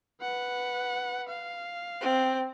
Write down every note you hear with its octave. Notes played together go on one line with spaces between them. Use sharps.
B4 F#5
F5
C4